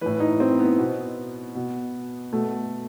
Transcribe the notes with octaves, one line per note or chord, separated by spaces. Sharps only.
A2 E3 B4
D#4
C4
B3
B2
B2
B2 A3